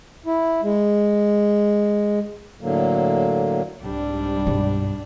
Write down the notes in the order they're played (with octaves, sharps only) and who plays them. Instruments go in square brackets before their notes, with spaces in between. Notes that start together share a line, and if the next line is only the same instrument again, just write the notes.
[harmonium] E4
G#3
A2 D3 F#3 A#3
[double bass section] C2 G#2 G3 [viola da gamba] D4
[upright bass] G2 B2